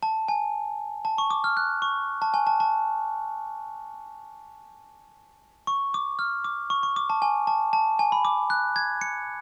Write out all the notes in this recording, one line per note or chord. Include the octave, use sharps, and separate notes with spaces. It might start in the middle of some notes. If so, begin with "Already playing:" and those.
A5
G#5
A5
C#6
D6
F6
F#6
C#6
A5
G#5
A5
A5
C#6
D6
F6
D6
C#6
C#6
D6
A5
G#5
A5
A5
G#5
B5
D6
F#6
G#6
C#7